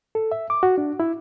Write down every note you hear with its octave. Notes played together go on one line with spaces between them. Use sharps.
A4
E5
D6
F#4
D4
E4